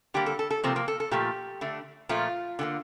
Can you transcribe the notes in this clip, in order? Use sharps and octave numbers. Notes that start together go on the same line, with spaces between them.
D3 G3 A#3 G4
A4
A4
A4
C3 F3 A#3 C4
A#3
A4
A4
A#2 F3 A3 G4
D3 A3
A#2 F3 A3 F4
D3 G3 A#3